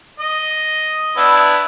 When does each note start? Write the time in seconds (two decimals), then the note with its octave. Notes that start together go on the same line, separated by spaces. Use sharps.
0.20 D#5
1.17 B3 D4 E4